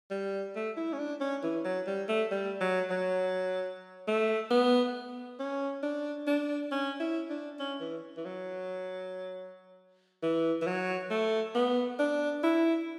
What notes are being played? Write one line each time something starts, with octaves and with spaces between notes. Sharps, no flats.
G3
A3
E4
C#4
D4
C#4
E3
F#3
G3
A3
G3
F#3
F#3
A3
B3
C#4
D4
D4
C#4
E4
D4
C#4
E3
E3
F#3
E3
E3
F#3
A3
B3
D4
E4